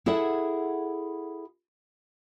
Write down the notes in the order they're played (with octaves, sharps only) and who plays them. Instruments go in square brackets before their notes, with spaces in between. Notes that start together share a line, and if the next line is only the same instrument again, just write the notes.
[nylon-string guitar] E4 G#4 A4 E5 F#5